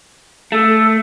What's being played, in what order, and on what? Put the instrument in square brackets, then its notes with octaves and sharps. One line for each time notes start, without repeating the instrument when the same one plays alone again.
[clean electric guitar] A3 [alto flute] A4